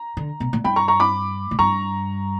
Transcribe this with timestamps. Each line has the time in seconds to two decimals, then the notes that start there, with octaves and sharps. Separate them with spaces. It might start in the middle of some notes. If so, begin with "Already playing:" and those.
Already playing: A#5
0.17 D3
0.40 B2
0.53 A#2
0.64 G2 G5 B5
0.76 A#5 C#6
0.88 A#5 C#6
1.00 B5 D6
1.51 A#2
1.59 G2 A#5 C#6